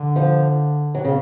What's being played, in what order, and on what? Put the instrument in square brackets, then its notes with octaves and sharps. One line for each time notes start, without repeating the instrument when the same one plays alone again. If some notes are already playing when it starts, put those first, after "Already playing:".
Already playing: [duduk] D3
[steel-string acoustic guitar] F3
F#3
C#3